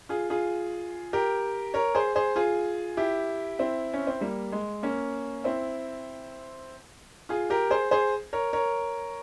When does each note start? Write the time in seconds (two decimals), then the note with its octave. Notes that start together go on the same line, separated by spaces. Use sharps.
0.09 F4 G#4
0.30 F4 G#4
1.13 G4 A#4
1.74 A#4 C#5
1.95 G#4 C5
2.16 G#4 C5
2.36 F4 G#4
2.97 E4 G4
3.59 C4 E4
3.94 C#4
4.07 C4
4.21 G3 A#3
4.52 G#3
4.83 A#3 C#4
5.44 C4 E4
7.29 F4 G#4
7.50 G4 A#4
7.70 G#4 C5
7.91 G#4 C5
8.33 A#4 C#5
8.53 A#4 C#5